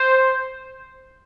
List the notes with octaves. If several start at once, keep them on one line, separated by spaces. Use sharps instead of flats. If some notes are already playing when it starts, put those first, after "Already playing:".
Already playing: C5